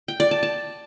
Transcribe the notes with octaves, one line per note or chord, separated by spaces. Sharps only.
G5
D5
A5
A5